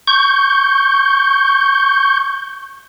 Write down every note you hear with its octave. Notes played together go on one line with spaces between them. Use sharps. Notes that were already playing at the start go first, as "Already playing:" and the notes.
C#6 G6